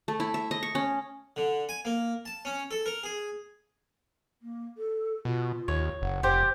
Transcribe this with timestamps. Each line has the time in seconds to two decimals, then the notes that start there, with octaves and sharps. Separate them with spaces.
0.08 A3
0.20 E4
0.34 E5
0.51 D#5
0.63 C#6
0.75 C#4
1.36 D3
1.69 G#5
1.85 A#3
2.26 A5
2.45 C#4
2.71 A4
2.86 A#4
3.03 G#4
4.42 A#3
4.77 A4
5.25 B2 F4
5.68 D#2 C#5
6.02 F#1 F#5
6.23 F1 G4 C5